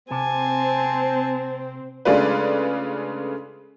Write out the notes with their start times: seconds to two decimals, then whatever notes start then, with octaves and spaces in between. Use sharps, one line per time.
0.11 C3 C4 G#5 A5
2.05 C#3 G#3 A3 D4 F4 B4